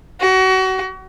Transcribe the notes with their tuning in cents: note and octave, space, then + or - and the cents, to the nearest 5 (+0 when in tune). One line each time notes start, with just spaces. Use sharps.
F#4 +30